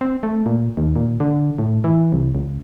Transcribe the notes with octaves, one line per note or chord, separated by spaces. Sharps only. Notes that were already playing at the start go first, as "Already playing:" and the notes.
C4
A3
A#2
D#2
A#2
D3
A2
E3
C2
C#2